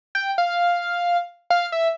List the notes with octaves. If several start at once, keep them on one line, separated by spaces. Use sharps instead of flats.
G5
F5
F5
E5